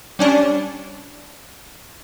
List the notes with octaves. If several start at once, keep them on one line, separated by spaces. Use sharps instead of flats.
G3 C#4 D4